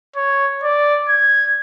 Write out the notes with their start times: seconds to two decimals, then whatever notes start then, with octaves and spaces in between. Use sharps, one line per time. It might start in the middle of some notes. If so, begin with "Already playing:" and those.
0.16 C#5
0.64 D5
1.09 G#6